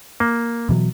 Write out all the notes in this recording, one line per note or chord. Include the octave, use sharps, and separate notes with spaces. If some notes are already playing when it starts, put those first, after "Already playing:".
A#3
B2 E3 F#3